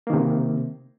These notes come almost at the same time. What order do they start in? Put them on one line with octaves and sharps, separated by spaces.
A#3 D#3 C3